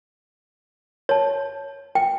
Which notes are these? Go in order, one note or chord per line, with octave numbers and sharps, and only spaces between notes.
C#5 A5
G5